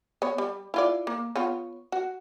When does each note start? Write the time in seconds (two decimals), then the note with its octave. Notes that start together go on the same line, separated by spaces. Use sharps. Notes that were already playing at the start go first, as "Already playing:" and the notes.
0.22 B3 C#5
0.38 G3
0.74 E4 F4 D5
1.07 A#3
1.36 B3 F4 C#5
1.92 F#4